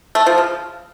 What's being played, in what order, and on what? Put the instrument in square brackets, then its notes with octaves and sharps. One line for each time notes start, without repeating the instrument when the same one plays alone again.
[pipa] A3
F3
C#3